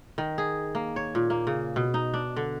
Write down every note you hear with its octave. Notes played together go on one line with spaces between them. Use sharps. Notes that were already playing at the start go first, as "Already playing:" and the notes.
D#3
G#4
A#3
C#5
A#2
A#3
C#3
B2
D#4
D4
D3